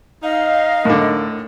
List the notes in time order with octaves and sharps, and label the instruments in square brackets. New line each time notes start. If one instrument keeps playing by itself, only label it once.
[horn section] D#4 F5 [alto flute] D#5
[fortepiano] A2 D3 [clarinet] A#4